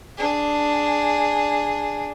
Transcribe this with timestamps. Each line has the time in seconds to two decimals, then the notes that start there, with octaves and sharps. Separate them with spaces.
0.18 D4 G#4